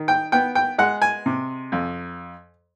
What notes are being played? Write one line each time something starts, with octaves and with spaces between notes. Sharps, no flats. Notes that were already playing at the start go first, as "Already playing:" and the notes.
Already playing: D#3
G5
B3 G5
G5
G#3 F#5
G#5
C3
F2